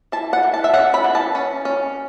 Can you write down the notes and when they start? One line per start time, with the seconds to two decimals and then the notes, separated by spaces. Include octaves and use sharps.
0.12 E3 A5
0.33 F#5
0.43 E3
0.54 A5
0.64 E5
0.74 C#4 F#5
0.94 B5
1.04 E3
1.15 A5
1.35 C#4
1.65 C#4